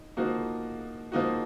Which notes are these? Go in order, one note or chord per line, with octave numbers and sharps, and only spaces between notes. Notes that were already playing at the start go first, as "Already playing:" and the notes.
Already playing: D#4
F3 A#3 D#4 F#4
F3 A#3 D#4 F#4